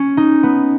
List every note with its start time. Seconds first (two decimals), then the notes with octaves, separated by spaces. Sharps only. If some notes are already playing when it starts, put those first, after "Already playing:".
Already playing: C#4
0.17 D#4
0.43 B3